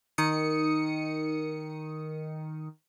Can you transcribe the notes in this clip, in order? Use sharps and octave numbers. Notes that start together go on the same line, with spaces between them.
D#3 D#6 C#7